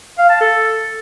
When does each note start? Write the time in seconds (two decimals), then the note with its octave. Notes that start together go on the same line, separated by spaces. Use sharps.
0.18 F5
0.29 A5
0.41 A4